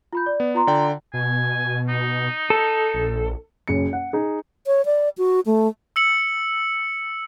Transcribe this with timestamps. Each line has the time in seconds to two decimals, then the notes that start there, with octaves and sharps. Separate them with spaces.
0.13 F4 B5 G6
0.26 D5
0.40 B3
0.55 F4 A#5 C6
0.67 D3 D5 G5
1.14 B2 G#5
1.89 D#4
2.50 A4
2.94 A#1
3.68 F#1 F#2 C#7
3.93 F#5
4.13 D#4 G#4
4.67 C#5
4.85 D5
5.18 F#4
5.46 A3
5.96 E6 C#7 F#7